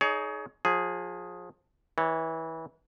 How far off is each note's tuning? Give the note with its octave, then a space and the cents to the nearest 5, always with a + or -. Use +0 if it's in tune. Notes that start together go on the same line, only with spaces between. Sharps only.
D#4 +5 G#4 +25 C#5 +25
F3 +35 G#4 +0
E3 -25 C#5 -5